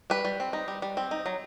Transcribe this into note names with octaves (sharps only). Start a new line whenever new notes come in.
G3 B4
G3
C4
D#4
G3
G3
C4
D#4
F#3